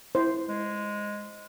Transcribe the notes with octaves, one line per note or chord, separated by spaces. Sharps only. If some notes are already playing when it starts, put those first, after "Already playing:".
E4 C5
G#3